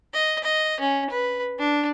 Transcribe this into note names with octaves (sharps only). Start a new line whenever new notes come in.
D#5
D#5
C#4
B4
D4